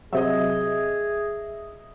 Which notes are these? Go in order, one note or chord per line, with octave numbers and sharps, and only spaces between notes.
C3 F#3 G#4 D#5 E5